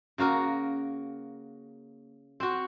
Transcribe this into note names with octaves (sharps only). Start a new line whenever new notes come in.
C#3 A#3 F#4 A#4
C4 F#4